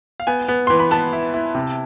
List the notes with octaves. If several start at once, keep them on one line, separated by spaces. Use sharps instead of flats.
F5
B3 G#5
B3
E3 C6
B5
B3 A5
E4
E4
C3